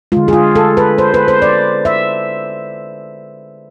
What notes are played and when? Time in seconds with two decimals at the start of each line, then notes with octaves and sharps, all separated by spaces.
0.12 D3 G#3 F4
0.28 G#4
0.33 F4
0.55 A4
0.77 B4
0.98 C5
1.14 B4
1.28 C5
1.42 D5
1.85 E5